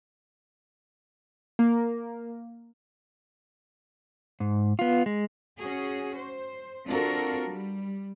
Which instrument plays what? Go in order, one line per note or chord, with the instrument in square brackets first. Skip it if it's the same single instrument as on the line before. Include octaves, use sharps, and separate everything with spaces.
[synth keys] A#3
[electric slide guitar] G#2
B3 F4
G#3
[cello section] C#4 F#4 G#4
C5
C4 D4 F4 F#4 A4 A#4
G3